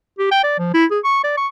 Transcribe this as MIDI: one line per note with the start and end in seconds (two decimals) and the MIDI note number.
0.18 0.29 67
0.31 0.43 79
0.44 0.56 74
0.59 0.74 53
0.74 0.85 64
0.91 0.99 68
1.04 1.23 85
1.24 1.37 74
1.37 1.47 85